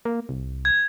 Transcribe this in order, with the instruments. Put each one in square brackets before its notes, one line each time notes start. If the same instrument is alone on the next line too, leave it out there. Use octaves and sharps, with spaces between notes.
[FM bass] A#3
C2
[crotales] G#6